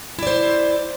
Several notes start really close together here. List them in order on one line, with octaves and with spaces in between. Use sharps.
E4 D5 C5